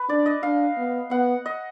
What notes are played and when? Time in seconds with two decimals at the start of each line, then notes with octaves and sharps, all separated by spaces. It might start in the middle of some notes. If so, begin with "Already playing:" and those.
Already playing: B4
0.09 D4 D5
0.26 D#5
0.43 D4 F5
0.77 B3
1.11 B3 F#5
1.46 D#5